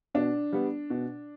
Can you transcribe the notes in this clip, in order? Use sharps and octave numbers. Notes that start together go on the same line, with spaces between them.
B2 D4
G3 B3
B2